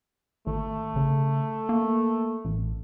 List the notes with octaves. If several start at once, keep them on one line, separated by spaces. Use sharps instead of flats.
G#1 A3
C#3
A#3
A1